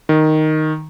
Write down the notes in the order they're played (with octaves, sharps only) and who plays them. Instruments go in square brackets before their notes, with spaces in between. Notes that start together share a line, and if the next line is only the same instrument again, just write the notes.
[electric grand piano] D#3